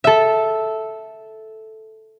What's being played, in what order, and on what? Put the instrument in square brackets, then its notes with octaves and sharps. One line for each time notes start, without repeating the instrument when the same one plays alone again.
[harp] A4 E5